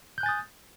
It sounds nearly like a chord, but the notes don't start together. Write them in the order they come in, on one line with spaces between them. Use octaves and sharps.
G6 F#6 G#5 A6 D#6